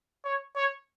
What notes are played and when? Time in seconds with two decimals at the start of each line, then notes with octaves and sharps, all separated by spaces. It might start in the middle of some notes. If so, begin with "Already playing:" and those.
0.25 C#5
0.55 C#5